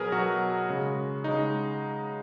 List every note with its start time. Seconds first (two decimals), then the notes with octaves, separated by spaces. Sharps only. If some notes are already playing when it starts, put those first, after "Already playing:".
Already playing: B2 F#3 G#4 A#4 B4
0.12 B2 F#3 F#4
0.68 C#3 G#3
1.24 C#3 G#3 D#4